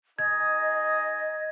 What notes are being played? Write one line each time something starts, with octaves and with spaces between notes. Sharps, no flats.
D#4 G#4 D#5 D#6 G#6